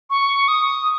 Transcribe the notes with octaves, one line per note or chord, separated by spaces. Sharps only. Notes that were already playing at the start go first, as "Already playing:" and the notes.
C#6
D#6